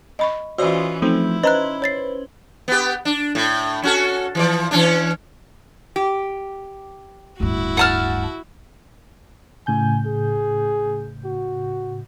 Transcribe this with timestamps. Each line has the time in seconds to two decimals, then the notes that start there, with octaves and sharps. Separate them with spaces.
0.19 D#5 B5 C#6
0.58 E3 C#4 F4 F#4 C5 D5 D#5
1.02 F3 A3 C4 D#4 E4
1.43 C#4 B4 C5 D#5 A#5 F#6
1.82 C#5 A6 C7
2.68 B3 G4
3.05 D4
3.35 A2
3.83 C#4 F#4 A4
4.35 E3 F3 D5
4.71 E3 C#4 D4
5.96 G4
7.40 D1 G2 E4 F#4
7.77 F#5 A5 F6
9.67 A2 C#3 G#5 G6
10.06 G#4
11.25 F#4